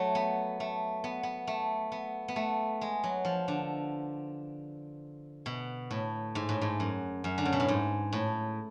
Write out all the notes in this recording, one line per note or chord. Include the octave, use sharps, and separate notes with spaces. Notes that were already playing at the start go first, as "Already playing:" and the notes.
Already playing: F#3 A3
B3
A3
B3
B3
A3
B3
B3
A3
G#3
F#3
F3
D3
B2
A2
G#2
A2
G#2
F#2
F#2
D3
C#3
B2
A2
G#2
A2